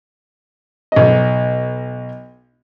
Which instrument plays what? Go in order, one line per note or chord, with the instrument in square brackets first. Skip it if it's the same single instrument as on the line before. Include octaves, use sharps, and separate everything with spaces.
[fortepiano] B1 D#5